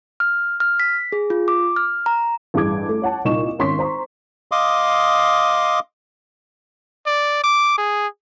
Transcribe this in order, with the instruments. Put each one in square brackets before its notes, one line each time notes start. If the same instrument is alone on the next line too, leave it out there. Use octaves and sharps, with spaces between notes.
[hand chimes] F6
F6
B6
G#4
F4
D6
F6
A#5
[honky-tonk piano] A1 G2 G#4 D6 G#6
A3
C#5 F#5 A5
C2 A#2 D#4 C#6 E7
G#1 C#4 C6 C#6 B6
C5 A#5 C6 C#6
[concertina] D#5 F5 C6 D6 D#6
[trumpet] D5
D6
G#4